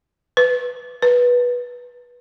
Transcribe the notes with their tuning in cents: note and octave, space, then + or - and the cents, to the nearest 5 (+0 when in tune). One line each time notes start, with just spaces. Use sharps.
B4 +15
B4 -15